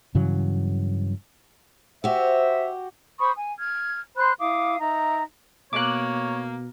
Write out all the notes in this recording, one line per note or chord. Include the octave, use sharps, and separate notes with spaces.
G2 C#3 E3 F#3
F#4 G4 C5 E5
C5 B5 C#6 D#6
G#5
F6 G#6
C5 B5 C6 F#6
E4 F5 D6 D#6
D#4 E5 A#5
B2 A#3 C#5 D6 F#6